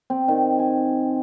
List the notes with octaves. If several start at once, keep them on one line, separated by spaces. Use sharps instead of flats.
C4
D#3
G#5